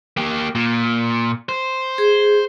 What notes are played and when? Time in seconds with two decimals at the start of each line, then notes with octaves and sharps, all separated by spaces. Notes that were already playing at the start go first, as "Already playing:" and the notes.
0.17 A#3 G4
0.55 A#2
1.49 C5
1.98 G#4